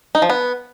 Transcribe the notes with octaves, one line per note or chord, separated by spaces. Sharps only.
D#4
F3
B3